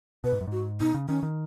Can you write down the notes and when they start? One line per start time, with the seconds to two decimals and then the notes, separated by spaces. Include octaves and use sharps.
0.24 B2 B4
0.32 G#2
0.41 F#2
0.47 G#2 F#4
0.80 B2 D#4
0.94 C#3
1.08 D#3 C#4
1.23 D#3